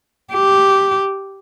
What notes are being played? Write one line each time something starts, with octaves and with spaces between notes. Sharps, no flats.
G4